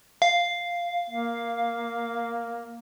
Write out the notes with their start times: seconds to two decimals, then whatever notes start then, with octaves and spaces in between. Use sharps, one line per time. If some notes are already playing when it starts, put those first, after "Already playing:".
0.22 F5
1.10 A#3